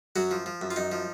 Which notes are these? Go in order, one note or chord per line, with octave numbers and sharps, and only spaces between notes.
F#2 F#3 F#4
F3
F3
F#2
F4
F#2 D#4
F3